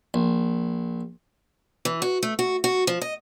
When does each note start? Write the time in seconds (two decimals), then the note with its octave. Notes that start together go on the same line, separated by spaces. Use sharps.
0.14 A#1
1.85 E3
2.02 F#4
2.23 A3
2.39 F#4
2.64 F#4
2.87 F3
3.02 D#5